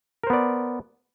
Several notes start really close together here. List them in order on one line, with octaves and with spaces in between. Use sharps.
A#4 C5 B3 D5